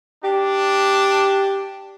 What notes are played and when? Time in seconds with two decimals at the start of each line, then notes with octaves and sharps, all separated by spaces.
0.24 D4 G4